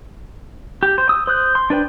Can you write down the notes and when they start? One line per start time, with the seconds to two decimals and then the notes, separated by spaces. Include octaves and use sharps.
0.83 G4
0.98 C5
1.09 D#6 E6
1.27 C5 D#6 F#6 G6
1.55 C6
1.70 D4 B4 C5 G5